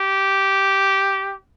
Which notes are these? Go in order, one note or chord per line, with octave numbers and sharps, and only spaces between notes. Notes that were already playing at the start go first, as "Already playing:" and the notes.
Already playing: G4